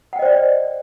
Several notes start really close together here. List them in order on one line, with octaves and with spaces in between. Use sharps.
F#5 G5 D#5 C5 D5